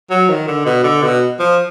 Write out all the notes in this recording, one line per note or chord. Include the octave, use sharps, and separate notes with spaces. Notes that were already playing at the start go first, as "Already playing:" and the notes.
F#3
D#3
D3
B2
D3
B2
F3